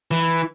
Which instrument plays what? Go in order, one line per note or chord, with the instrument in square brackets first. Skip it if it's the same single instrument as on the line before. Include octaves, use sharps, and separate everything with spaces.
[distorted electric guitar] E3